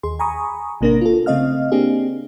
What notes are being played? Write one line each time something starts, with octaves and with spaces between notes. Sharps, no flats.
D#2 G#4 C6
G#5 A#5 B5 C#6 D#6
A1 C3 A#3 D4 A#4 A#6
F4 A4
C#3 A3 C4 D#5 F5 F6
A#3 C4 D4 G4 G#4